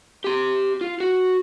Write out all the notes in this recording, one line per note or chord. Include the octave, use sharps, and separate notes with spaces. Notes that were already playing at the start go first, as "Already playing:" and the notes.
G4 C6
F4
F#4